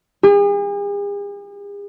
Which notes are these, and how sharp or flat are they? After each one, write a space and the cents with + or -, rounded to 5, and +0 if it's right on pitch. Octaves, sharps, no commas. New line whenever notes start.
G#4 -45